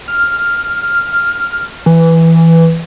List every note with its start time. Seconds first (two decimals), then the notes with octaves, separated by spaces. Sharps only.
0.08 F6
1.86 E3